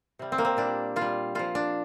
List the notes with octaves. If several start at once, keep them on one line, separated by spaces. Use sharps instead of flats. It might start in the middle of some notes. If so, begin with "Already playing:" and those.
C3 G3
C4
A#3
C4
A#2 G3 D4
A#2 F4
G3
A#2 F3 F4
D4